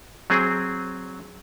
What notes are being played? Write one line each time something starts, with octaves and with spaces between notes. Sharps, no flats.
F#3 C4 G#4